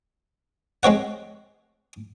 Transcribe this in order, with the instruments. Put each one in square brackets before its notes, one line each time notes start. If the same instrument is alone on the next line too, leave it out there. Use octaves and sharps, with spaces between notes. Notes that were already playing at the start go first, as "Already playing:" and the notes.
[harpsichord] G#3 C4 C#5 F#5